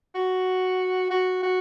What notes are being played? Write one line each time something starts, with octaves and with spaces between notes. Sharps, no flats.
F#4
F#4
F#4